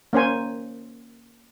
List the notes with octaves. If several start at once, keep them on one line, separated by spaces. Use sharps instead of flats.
A#3 C#4 C5 G#5